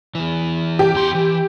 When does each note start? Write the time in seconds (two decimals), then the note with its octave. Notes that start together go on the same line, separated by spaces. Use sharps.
0.15 E2 E3
0.79 G4
0.95 E2 C6
1.15 E3